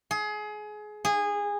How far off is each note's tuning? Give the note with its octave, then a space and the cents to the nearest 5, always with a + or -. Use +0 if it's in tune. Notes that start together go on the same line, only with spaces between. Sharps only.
G#4 +25
G#4 -20